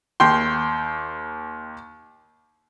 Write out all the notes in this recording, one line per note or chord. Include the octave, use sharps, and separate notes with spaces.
D#2 G5 C6